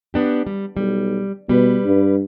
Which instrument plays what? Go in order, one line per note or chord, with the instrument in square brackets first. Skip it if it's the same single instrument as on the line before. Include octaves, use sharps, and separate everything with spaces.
[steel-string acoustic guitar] B3 D4 G4
G3
[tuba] B1 [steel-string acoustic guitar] G3
[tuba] B2 [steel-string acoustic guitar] G3 B4
[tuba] G2